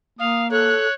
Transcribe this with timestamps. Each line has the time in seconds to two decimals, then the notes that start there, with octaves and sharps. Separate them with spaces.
0.19 A#3 F5 D#6
0.51 A4 C#5 F#6